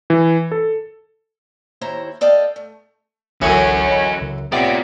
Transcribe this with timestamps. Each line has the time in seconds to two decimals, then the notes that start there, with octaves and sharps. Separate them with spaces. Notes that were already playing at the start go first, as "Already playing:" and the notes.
0.10 E3
0.52 A4
1.81 D#2 E4 C5 C#5 A#5
2.21 A4 D5 D#5 F5 G5
2.56 A3
3.42 G1 C#2 F#2 D3 E3 C#4 F#4 G#5
3.88 C#5 D#5 B5
4.21 C#2 C#3 A#4
4.52 C3 B3 F4 C#5 D5